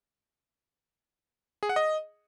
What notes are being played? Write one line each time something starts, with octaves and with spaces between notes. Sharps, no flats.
G#4
F#5
D#5